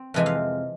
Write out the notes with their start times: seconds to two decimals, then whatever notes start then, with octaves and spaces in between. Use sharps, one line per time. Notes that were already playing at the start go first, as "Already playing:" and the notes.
Already playing: C4
0.14 F2 C3 E3 G#3 G#5
0.26 F5